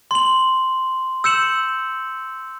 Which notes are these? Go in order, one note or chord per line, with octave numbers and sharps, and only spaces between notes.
C6 F#7
E6 G6 C#7 E7 F#7